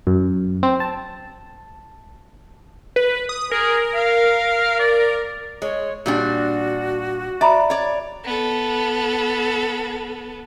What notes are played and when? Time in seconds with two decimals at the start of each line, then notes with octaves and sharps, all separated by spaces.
0.07 F#2
0.63 C4
0.80 A5
2.96 B4
3.29 D#6
3.52 G#4 A#4
3.94 F5
4.79 D5
5.62 G#3 C#5
6.06 A#2 G3 D4 F#4
7.41 D5 E5 A#5 B5
7.70 C#5 D5
8.25 B3 A4